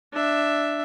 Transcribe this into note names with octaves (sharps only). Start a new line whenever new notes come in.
D4 E5